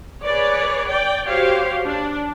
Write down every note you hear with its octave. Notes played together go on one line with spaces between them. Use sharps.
G#4 B4 C#5 D5
D5 G5
F#4 G4 C5 C#5 F5
D4